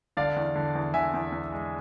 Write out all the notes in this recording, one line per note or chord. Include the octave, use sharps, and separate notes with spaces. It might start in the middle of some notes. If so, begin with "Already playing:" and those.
D3 D5 F5
E2
D3
E2
D3 E5 G#5
E2
E2
G#3